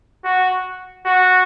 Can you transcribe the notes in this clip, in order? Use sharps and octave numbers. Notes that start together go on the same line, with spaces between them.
F#4
F#4